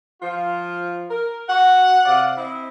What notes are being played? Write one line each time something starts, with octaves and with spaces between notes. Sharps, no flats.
F3 F4
A#4
F#4 F#5
C3 D5 F5
C4 E4 D#5